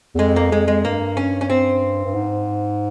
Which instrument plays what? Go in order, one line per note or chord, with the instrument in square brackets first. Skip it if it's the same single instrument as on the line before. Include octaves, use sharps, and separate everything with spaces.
[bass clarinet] E2
[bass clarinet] F2 [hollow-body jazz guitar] G#3
[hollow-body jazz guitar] A#3
[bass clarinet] F2 [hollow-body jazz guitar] G#3
[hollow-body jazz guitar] G#3
[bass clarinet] G2 [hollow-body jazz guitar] A#3
[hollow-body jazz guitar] C#4
C#4
C4
[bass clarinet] G2
G#2